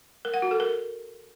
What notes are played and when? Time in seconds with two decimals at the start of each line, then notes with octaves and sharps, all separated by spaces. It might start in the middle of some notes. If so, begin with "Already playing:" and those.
0.25 A#4
0.34 F#5
0.42 F#4
0.51 A4
0.60 A#4